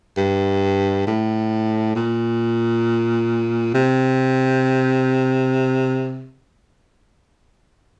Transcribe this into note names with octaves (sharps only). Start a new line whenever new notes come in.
G2
A2
A#2
C3